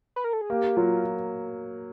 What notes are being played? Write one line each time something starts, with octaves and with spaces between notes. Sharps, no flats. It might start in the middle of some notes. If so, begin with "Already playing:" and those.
B4
A#4
A4
G#4
A#3 G4
F#3 F4